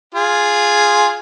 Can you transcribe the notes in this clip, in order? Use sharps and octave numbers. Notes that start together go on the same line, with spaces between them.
F4 G#4